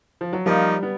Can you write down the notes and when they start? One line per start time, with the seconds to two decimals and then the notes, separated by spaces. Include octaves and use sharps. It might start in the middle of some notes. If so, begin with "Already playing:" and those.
0.21 F3
0.33 F#3
0.45 F3 G3 A#3 D#4
0.83 B3